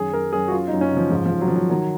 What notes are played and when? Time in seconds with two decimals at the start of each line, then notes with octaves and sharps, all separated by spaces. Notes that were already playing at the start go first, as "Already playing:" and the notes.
Already playing: F#2 D#3 G#4
0.12 F#2 A#4
0.33 F#2 G#4
0.48 F#4
0.52 F#2 F4
0.68 F#2 D#4
0.81 C#4
0.91 C#3
0.97 F3
1.11 G#2 F3
1.26 F3
1.31 G#2
1.41 F#3
1.48 D#3 F3
1.56 F#3
1.70 D#3 F#3